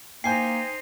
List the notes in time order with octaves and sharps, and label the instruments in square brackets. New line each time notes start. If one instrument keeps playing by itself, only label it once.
[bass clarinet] A#3 [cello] D#4 C5 [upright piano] G5 G#5 G6 [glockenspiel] C7